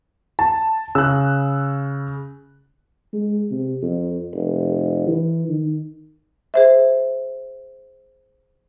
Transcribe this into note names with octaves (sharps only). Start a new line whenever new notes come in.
A5
C#3 E6 F#6
G#3
C3
F2
F1
E3
D#3
G#4 C5 E5